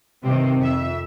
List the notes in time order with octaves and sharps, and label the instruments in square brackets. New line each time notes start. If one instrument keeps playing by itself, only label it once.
[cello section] G2 C3 D#3 C4
F2 E5